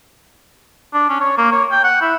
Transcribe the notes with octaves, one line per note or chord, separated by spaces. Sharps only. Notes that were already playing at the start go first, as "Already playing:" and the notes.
D4
C#4
C#5
A#3
C#5
G5
F#5
E4